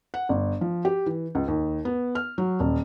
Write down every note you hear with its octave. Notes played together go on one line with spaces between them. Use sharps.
F#5
G1
F3
G4
E3
C#2
D#2
B3
F6
F#3
D#1